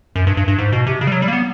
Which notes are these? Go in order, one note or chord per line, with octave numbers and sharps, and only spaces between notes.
F#2
G2
G2
G2
G#2
B2
C3
C#3
G3
F#3
G3
A#3
B3